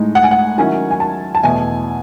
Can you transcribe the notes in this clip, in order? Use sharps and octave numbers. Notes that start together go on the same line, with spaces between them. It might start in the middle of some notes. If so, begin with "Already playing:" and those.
Already playing: A2 G#3 D#4
F#5
G#5
F#5
D#3 F#3 C#4 E4 G#5
G#5
A5
A5
E2 B2 A3 E4 G#5